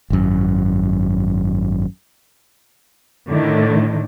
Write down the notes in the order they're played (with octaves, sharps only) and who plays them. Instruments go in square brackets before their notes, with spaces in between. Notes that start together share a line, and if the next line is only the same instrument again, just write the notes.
[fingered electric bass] G#1 F#2
[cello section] A2 D3 D#3